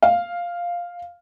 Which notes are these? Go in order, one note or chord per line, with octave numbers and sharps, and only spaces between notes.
F5